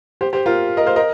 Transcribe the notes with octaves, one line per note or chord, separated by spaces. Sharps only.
G4 C5
G4 C5
F4 A#4
A#4 D#5
C5 F5
A#4 D#5